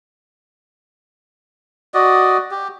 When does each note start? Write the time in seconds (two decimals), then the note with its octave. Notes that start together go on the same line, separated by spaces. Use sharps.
1.94 F#4 D5 D#5
2.51 G4